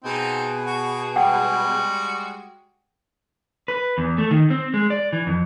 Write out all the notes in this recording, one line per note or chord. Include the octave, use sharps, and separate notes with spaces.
B2 B3 C4 D#4 G#4
F#4
G3 G#3 F#4 F#5 G5
B4
E2
A3
D#3
C4
G#3
D5
E3
F2